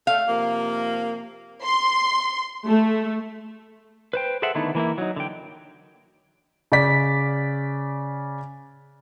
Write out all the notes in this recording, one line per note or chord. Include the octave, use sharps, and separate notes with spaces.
A3 F5
C3 F3 A#3
C6
A3
B4 C5 G5
G#4 A4 C5 E5 F#5
D3 D#3 A3 B3 D#4 E4
E3 A#3 D#4 E4
F#3 D#4
D3 G5
C#3 D5 B6